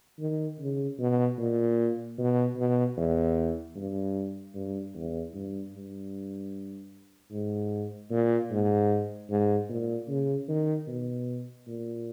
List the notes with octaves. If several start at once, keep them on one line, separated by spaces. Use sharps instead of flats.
D#3
C#3
B2
A#2
B2
B2
E2
G2
G2
E2
G2
G2
G#2
A#2
G#2
G#2
A#2
C#3
D#3
B2
A#2